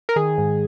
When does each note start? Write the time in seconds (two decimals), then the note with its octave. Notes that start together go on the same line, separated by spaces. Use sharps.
0.09 A#4
0.16 D#3 G#4
0.38 G#2